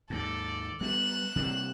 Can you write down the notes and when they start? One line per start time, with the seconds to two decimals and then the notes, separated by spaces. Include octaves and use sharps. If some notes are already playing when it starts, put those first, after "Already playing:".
0.10 D#2 G#2 A4 D5
0.81 G3 B3 F#6 E7
1.36 C3 G3 A#3